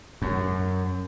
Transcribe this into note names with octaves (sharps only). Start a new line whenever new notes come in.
F#2